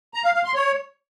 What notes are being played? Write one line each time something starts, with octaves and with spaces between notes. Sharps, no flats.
A#5
F5
F5
C6
C#5